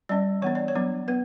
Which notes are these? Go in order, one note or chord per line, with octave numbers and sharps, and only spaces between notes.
G3 C#4 D5
E3 B3 D4 C#5
D5
C#5
F#3 B3 D4
B3 B4